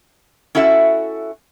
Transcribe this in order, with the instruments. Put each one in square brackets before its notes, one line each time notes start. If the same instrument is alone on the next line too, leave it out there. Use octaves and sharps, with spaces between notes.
[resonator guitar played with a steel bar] C#4 E4 F#4 A4 E5